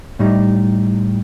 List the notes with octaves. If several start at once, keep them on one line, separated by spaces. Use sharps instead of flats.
A2 G3 D#4